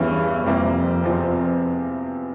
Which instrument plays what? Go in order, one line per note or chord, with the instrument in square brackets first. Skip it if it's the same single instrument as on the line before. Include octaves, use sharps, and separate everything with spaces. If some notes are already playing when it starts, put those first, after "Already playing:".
Already playing: [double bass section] E2 [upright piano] G2 E3 G3 C#4
[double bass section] F2 [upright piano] C3 E3 G3 A#3
[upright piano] E2 C3 F3 C4 F4